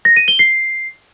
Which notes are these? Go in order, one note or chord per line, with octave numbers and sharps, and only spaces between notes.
A#6
D#7
G7
C7